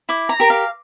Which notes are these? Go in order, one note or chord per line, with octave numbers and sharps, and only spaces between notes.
E4 D6
A#5
G4 A#4
F5